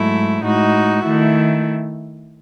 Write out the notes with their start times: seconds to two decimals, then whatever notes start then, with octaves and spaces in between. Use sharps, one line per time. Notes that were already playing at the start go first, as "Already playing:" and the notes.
Already playing: G#2 F#3 A3 E4
0.43 A2 G#3 D#4 F#4
1.04 D#3 A3 E4